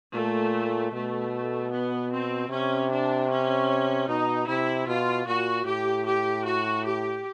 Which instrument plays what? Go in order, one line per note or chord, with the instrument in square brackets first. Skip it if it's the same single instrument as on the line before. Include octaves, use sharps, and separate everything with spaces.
[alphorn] A#2 [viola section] A3
[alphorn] B2 [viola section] A3
[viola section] B3
C4
[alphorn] C3 [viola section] C#4
[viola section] D4
C#4
[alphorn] B2 [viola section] D#4
[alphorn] C3 [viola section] E4
[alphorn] B2 [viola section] F4
[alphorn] A#2 [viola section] F#4
[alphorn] A2 [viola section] G4
[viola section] G4
F#4
G4